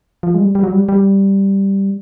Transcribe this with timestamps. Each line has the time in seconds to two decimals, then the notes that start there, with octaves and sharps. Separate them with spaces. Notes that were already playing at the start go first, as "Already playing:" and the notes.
0.23 F3
0.34 G#3
0.39 G3
0.55 G3
0.63 F#3
0.72 G3
0.89 G3